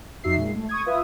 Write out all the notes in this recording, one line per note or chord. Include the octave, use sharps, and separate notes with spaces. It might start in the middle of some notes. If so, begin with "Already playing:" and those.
F2 D#4 F#4 E5 C7
A#2 G#3
A3
C#6 D#6 G#6
F4 B4 E5 D#6